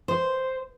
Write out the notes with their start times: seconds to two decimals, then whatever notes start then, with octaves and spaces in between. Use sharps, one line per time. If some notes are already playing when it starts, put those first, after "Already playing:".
0.08 C5